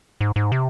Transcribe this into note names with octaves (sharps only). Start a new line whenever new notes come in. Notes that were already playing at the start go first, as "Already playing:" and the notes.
G#2
G#2
C3